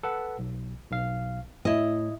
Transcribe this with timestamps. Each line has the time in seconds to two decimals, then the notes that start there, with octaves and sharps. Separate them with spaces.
0.03 A4 B4 F#5
0.39 B1
0.92 B1 F5
1.65 A2 E4 D#5